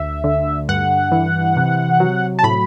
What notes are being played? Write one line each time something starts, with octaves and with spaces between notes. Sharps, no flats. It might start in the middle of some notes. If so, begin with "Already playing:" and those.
Already playing: D2 E5
D3
G2 F#5
E3
C3
F#3
A5
A2 B5